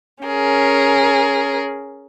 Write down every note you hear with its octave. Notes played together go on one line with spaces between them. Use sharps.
C#4 G#4 A#4